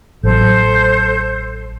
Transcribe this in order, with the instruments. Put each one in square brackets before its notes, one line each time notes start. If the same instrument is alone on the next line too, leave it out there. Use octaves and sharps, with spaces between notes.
[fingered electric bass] A1 F#3 [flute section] A4 C5 G6